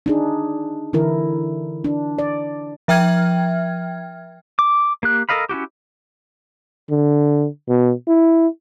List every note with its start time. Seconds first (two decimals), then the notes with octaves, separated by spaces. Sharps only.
0.06 D4 D#4 G#4
0.93 D3 E3 E4 A#4
1.84 D4
2.19 D5
2.88 F3 E5 G5 F6 G#6
4.59 D6
5.03 A#3 G4 F#6
5.29 A4 A#4 D#5 F5 B5
5.49 C#4 E4 F#4 G4
6.91 D3
7.69 B2
8.08 E4